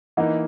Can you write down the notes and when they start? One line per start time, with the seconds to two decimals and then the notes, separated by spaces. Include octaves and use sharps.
0.17 E3 A#3 D#4 D#5 F#5